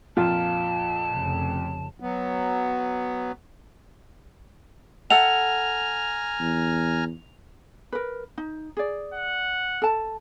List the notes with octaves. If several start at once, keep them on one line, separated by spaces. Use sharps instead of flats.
F2 A#2 F4 A5
F1 C#3
F#3 B3
A4 E5 F#5 G#5 A#5 F6 F7
E2
A#4 B4
D#4
G#4 D5
F#5
A4 A5